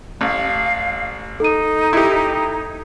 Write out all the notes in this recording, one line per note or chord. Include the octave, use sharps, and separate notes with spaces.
A1 F5
D#4 A4 D#7
E4 G4